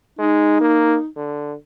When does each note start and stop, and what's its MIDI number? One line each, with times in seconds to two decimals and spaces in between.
0.19 0.56 56
0.19 1.06 63
0.61 0.96 58
1.16 1.54 50